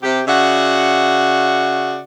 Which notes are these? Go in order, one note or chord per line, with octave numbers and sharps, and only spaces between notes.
C3 G4
C#3 F#4 D5 E5 F#5